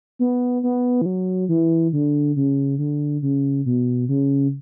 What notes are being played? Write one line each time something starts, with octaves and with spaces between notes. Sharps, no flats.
B3
B3
E3
F#3
E3
D3
C#3
D3
C#3
B2
C#3